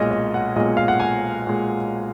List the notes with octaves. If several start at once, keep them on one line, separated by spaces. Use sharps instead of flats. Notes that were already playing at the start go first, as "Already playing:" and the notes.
Already playing: B1 A#2 G#3 C#5 D#5
D#5
F#5
B1 A#2 G#3 D#5
F5
F#5
G#5
A#2 G#3